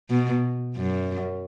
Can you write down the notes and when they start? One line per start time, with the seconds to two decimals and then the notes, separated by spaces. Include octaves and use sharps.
0.10 B2
0.76 F#2